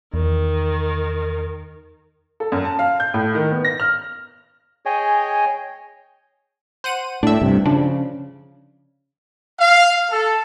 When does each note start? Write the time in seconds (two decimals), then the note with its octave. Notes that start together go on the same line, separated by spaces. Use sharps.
0.14 E2 D#3
2.40 A4
2.52 F#2
2.65 A5
2.79 F5
3.00 G6
3.14 A2
3.35 D#3
3.51 B3
3.65 A#6
3.80 F6
4.86 G#4 C#5 D#5 G5 G#5
6.84 C5 F#5 D#7
7.23 A2 D4 E5
7.41 G2 C3
7.65 C#3 F3 D4
9.59 F5
10.12 A4